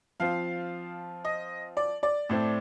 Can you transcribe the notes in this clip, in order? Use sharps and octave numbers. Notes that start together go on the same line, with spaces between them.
F3 C4 F4 F5
D#5
D5
D5
A2 A3 C4